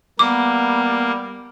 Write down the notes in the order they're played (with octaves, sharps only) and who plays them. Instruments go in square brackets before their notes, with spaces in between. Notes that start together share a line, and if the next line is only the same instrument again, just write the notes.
[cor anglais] G3 [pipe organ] A#3 [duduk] B3 [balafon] D6